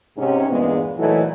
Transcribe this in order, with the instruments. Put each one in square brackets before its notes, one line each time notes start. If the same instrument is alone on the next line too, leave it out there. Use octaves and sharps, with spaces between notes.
[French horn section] G#2 C3 C#4
E2 G2 A#2 G#3 B3
A#2 E3 F#3 A3 D#4 A4